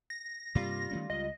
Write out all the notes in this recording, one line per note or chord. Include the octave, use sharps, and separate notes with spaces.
A#6
G2 C3 G3 A#3 F4
D#3 A3 C#4
C#2 D#5